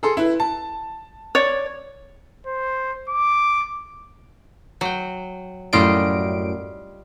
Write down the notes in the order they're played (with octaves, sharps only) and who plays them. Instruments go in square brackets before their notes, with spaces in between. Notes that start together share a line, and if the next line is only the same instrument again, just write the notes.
[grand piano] G#4 A4 C6
E4 B4
A5
[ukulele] C#5 D5
[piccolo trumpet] C5
D6
[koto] F#3 G5
[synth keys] F#2 A2 D7 [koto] G3 F4 D#5